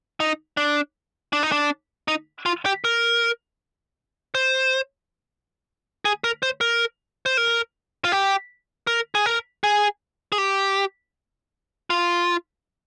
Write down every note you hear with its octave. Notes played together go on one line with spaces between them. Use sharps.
D#4
D4
D4
D#4
D4
D#4
F4
G4
A#4
C5
G#4
A#4
C5
A#4
C5
A#4
F4
G4
A#4
G#4
A#4
G#4
G#4
G4
F4